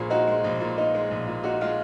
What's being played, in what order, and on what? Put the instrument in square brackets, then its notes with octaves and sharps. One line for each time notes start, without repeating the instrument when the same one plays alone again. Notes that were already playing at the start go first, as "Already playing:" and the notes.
Already playing: [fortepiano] A#1 A#2 G#3 G#4
D#4 F#4
G#3
A#1
A#2
D#4
G#3
A#1
A#2
D#4 F#4
G#3 F4